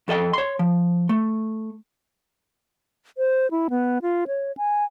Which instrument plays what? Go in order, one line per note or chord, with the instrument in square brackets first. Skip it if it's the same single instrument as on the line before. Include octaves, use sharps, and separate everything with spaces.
[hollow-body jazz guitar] F2 A4 D#5 G5
C#5 C6
F3
A3
[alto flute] C5
E4
B3
F4
C#5
G#5